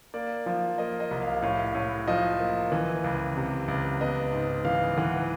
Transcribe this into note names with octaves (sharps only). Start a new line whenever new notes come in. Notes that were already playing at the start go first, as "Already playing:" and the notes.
A#3 D5
F3
A#3 D#5
D#5
C2
F5
A2 F5
A2
F3 D#5
A#3
E3
C#2
C3
C#2
B3 D#5
G#2
E3 F5
E3 F#5